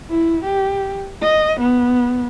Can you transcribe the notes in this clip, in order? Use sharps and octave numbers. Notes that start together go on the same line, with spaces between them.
E4
G4
D#5
B3